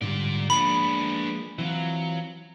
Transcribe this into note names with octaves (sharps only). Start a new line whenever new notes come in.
G#2 D3 G3 F4 D5
F3 G#3 A#3 B3 D4 B5
E3 F#3 C4 F4